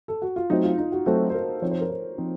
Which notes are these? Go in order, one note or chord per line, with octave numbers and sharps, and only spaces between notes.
A4
F#4
F4
F#3 A3 C4 D#4 F#4 C5
F4
D#4
F#4
F#3 A3 C4 F#4 A4 C5
C5
A#4
F3 C4 D#4 C#5
C5
A#4
C5
F3 C4 D#4